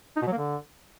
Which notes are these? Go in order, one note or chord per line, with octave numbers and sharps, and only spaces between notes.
D#4
B2
F#3
A#3
D3